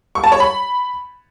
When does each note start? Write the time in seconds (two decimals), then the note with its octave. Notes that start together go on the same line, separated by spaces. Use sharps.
0.15 C#6
0.24 A5
0.32 C#5
0.40 B5